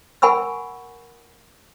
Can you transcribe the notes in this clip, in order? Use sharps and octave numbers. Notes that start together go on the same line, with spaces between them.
A#4 F#5 G#5 B5 C#6 E6